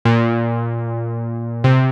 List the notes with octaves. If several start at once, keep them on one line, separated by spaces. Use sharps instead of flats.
A#2
C3